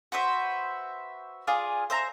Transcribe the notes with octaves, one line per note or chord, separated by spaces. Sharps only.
F#4 B4 C5 E5
F4 G#4 D5
C5 E5 A#5